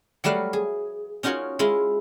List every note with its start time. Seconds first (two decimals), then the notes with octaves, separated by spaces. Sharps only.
0.24 F#3 G3 A3 B4 F5 F#5
0.53 G#4
1.23 C#4 D#4 F4 F#4 A#4 C#5
1.59 G#3 E4 F4